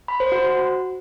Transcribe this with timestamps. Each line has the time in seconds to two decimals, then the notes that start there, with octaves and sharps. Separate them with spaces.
0.08 B5
0.20 C5
0.32 F#4